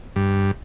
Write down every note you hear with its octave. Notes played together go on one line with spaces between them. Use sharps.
G2